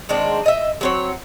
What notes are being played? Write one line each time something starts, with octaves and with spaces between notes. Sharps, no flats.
D#3 G#3 C4 D4
D#5 E5
F#3 C4 C#5